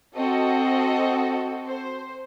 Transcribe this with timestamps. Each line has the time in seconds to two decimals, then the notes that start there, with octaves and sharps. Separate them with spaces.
0.15 C4 F#4 A4 D#5
1.67 C5